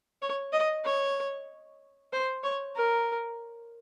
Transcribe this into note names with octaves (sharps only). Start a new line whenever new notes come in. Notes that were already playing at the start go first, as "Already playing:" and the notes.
C#5
D#5
C#5
C5
C#5
A#4